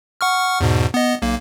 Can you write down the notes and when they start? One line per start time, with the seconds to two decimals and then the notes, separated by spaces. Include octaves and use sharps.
0.21 F#5 C#6 F6
0.60 E2 G#2 B2
0.94 B3 D#5
1.22 B1 A#3